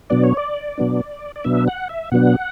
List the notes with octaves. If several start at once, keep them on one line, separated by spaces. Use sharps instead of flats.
B2 F#3 B3 D4 D5
C#5
D5
B2 F#3 B3 D4
D5
B2 F#3 B3 D4 E5
F#5
E5
B2 F#3 B3 D4 F#5